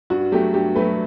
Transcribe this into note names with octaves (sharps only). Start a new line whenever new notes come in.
G2 F#4
F#3 A3 G4
G2 G4
F#3 A3 B4